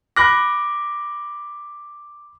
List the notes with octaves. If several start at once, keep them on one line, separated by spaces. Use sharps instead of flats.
B5 D6 F#6 A#6